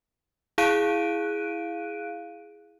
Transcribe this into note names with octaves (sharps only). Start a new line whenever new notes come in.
E4 G#4 F5 F#6 D7 D#7